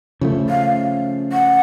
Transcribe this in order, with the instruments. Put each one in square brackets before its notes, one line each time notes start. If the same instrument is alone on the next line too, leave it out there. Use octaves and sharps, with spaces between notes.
[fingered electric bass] C#3 F3 A3
[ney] F5
F#5